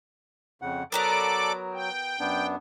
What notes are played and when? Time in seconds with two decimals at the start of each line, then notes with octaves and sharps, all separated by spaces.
0.62 F2 C#3 F#5
0.92 F#3 B3 F#4 A4 A#4 D5 D6
1.74 G5
2.19 F#2 B3 D4